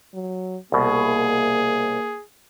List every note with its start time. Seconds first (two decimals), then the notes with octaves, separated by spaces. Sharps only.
0.14 F#3
0.72 C2 B2 A#3 G#4